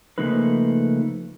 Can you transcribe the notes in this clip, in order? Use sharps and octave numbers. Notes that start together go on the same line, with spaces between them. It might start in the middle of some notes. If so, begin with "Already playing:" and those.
C#3 F3 A3 A#3 D#4 B4